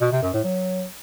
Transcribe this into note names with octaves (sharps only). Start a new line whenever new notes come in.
B2
C3
F#2
A2
F#3